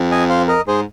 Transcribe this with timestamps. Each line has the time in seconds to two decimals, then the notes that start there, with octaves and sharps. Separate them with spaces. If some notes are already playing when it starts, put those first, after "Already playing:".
Already playing: F2
0.11 D#5 G#5
0.29 C5 F5
0.48 A#4 D#5
0.67 G#2 G#4 C5